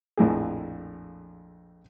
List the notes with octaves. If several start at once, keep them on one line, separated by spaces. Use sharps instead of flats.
A#1 F2 A2 G#4